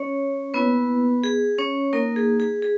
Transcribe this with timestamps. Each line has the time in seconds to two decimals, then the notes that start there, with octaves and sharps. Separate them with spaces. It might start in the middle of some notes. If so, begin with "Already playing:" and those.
Already playing: C#4 C#5
0.54 A#3 B3 E4 B4
1.24 G#4
1.58 C#4 C#5
1.93 A#3 D#4 A#4
2.16 G#4
2.40 G#4
2.62 G#4